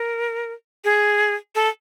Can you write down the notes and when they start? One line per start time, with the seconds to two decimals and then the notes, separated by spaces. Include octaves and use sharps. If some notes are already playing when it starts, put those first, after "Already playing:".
Already playing: A#4
0.85 G#4
1.55 A4